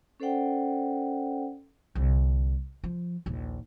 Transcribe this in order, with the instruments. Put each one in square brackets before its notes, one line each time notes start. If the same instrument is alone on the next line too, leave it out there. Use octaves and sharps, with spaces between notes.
[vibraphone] C#4 A4 C5 D5 F#5 G5
[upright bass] C2 D3
F3
A#1 D#2